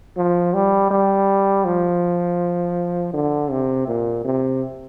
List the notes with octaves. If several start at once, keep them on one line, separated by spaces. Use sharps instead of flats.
F3
G3
G3
F3
D3
C3
A#2
C3